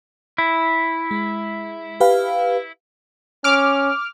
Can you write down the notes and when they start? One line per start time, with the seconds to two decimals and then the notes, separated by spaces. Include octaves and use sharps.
0.38 E4
1.11 G#3
2.00 G4 B4 F5
3.44 C#4 D6 F6